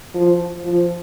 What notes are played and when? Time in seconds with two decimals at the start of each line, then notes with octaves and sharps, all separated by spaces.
0.15 F3
0.64 F3